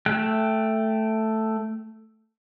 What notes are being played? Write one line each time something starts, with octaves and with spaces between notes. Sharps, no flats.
A3 G5 F#6